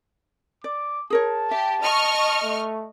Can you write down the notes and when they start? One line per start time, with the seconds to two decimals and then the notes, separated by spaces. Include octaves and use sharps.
0.64 D5 D6
1.10 G#4 A#4 C#5 A5
1.51 G4 E5
1.82 D#5 C#6 F6
2.42 A3